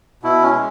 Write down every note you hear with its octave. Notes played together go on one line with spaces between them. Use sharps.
B2 E4
C#4
G#3